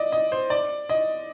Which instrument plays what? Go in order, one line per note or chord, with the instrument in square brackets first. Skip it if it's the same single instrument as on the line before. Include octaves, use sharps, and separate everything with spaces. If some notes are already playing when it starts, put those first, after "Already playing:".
Already playing: [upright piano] D5 D#5
D#5
C5
D5
D#5